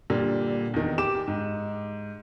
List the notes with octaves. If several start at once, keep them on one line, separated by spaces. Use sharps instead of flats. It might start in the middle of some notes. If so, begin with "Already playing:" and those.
A#2 D3 G3
E2 D#3
G4 D6 E7
G#2